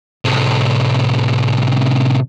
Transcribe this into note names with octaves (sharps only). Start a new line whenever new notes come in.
A2 C3